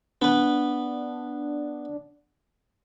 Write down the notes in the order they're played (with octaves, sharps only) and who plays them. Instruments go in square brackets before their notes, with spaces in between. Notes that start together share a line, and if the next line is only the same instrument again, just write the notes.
[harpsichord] B3 B4 [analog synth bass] D4